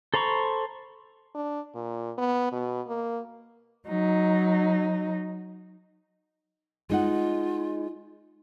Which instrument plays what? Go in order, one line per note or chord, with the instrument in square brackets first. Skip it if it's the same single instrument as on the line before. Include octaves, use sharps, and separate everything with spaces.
[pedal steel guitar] A4 C5 A#5 B5 C#6
[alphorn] D4
A#2
B3
B2
A#3
[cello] F#3 D#4
[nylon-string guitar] G#3 D#4 F#5 [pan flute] F4